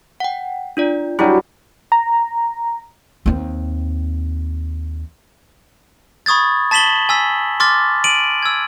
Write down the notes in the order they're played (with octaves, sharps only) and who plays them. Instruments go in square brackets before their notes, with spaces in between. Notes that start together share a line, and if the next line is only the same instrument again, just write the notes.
[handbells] F#5 G5
D4 F4 D5
[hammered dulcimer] F#3 G3 [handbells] D4 E4
[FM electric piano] A#5
[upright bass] D#2 C4
[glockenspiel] B5 C#6 D#6 G#6 A6
A5 A6 B6 E7 F#7 G7
G#5 E6 B6
C6 D6 F6 A6
D7 D#7 F#7
E6 G#6